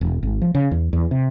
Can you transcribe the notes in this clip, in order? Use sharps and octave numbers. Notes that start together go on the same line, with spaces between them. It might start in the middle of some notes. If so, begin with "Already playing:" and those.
E1
G#1
F3
C#3
E2
E2
C3